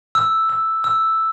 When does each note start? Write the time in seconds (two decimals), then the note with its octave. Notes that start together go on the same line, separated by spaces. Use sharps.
0.15 E6
0.49 E6
0.84 E6